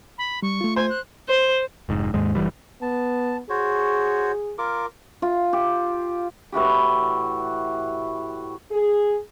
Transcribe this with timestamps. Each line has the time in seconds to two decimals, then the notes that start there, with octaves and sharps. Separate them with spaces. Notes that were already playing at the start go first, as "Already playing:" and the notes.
0.18 B5
0.42 G3 C#6
0.61 A3 F4
0.76 C5 G#5
0.89 F#6
1.28 C5
1.89 F1 G#2
2.14 D#2 G#2 G#3
2.35 F#1 D2 E3 G3
2.82 B3 A5
3.50 F#4 G#4 C5 C#5
4.58 F4 A#4 D6
5.22 F4
5.53 G4
6.52 A2 E3 F#4 G4
8.72 G#4